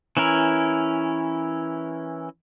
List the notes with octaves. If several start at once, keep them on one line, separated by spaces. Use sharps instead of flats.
E3 C#4 E4 A#4